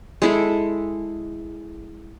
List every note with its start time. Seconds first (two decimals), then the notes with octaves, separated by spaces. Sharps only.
0.22 G#3 E4 A4